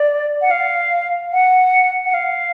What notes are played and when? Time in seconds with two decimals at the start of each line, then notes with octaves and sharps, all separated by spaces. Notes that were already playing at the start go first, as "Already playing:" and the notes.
Already playing: D5
0.42 F#5
0.51 F5
1.33 F#5
2.06 F#5
2.14 F5